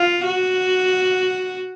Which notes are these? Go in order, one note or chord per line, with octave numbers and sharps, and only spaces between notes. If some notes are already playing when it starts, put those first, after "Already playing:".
Already playing: F4
F#4